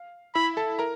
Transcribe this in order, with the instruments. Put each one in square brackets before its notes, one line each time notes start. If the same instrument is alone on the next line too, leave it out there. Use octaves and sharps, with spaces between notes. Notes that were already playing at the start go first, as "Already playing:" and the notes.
Already playing: [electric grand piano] F5
[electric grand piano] E4 E5 [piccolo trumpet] B5
[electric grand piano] A4 A5
A#4 A#5